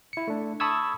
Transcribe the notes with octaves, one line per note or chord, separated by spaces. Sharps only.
E4 C#7
A3 D4
A5 B5 C#6 D#6 E6 G#6